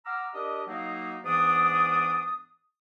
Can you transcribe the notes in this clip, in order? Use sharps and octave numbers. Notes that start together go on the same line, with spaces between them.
F#5 A#5 D6 E6 F6
D4 G4 A#4 D#5
F#3 A#3 D#4
G#2 E3 B3 D4 D#6